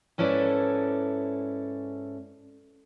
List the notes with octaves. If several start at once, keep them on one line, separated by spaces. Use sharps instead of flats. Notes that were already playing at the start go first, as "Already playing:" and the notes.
G#2 C#4 E4 A4 B4 D5